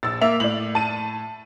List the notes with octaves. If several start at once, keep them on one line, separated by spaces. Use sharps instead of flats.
A#1 E6 A6
A#3 E5 F7
A2 D5 F#7
A5 D#7